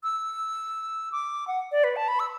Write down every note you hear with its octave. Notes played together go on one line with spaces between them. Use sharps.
E6
D6
F#5
D5
B4
A5
B5
E6